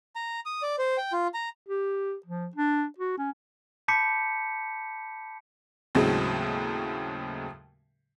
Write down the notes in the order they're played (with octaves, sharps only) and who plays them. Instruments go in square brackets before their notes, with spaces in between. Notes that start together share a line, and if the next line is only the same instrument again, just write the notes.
[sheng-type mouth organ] A#5
D#6
D5
C5
G5
F4
A#5
[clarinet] G4
F3
D4
F#4
C#4
[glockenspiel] A5 B5 D6 G6 B6 C#7
[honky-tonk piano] D#2 A2 C#3 F#3 G#3 C4